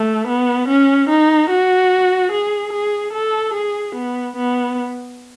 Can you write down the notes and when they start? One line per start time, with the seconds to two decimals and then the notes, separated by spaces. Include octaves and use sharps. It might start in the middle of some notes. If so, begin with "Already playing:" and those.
Already playing: A3
0.28 B3
0.68 C#4
1.09 D#4
1.50 F#4
2.32 G#4
2.73 G#4
3.13 A4
3.54 G#4
3.95 B3
4.36 B3